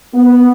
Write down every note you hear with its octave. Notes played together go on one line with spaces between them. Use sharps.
B3